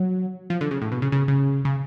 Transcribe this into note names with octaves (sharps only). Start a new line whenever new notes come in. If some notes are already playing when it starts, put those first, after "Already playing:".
Already playing: F#3
F3
D3
C#3
A2
B2
C#3
C#3
C#3
C#3